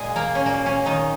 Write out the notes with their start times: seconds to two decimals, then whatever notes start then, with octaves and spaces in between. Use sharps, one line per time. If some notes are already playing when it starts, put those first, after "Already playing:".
Already playing: A#2 G#3 G#4
0.16 A#3 A#4
0.35 C#4
0.46 A#2 F#3 A#3
0.66 C#4
0.86 D#3 D#4